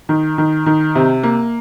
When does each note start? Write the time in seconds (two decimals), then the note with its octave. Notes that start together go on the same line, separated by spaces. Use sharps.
0.09 D#3
0.38 D#3
0.66 D#3
0.95 C3
1.23 A#3